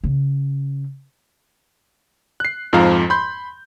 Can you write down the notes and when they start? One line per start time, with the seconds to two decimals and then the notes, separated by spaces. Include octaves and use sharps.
0.04 C#3
2.40 F#6 C7
2.73 F2 G#2 F3 F5 A#5
3.10 B5 C6 G6